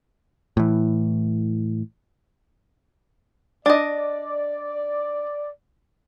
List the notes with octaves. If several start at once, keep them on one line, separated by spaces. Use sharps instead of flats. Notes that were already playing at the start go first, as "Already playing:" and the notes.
A2 E3
D4 D5 D#5